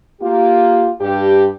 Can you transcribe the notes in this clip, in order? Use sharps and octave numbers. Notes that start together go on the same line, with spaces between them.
A#3 F4 G4
G2 G4